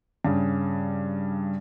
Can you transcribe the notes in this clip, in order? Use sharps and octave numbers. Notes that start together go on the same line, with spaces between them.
G2 C#3